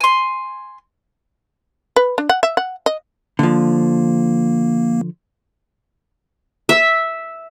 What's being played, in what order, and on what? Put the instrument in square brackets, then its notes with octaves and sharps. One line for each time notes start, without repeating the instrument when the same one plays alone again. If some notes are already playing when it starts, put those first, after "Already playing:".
[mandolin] G#5 C6
[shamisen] B4
D4
F#5
E5
F#5
D#5
[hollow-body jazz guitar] D3 F3 [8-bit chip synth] A#3
[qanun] E5